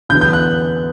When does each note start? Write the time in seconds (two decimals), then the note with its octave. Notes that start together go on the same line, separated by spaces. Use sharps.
0.09 E2 D3 F#3 B3 G6
0.21 G6
0.33 F#6